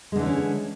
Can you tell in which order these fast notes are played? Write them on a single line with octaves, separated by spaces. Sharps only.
G#3 D3 E3 D#4 C#4